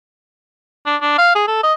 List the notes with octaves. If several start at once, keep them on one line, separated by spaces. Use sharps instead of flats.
D4
D4
F5
G#4
A4
D#5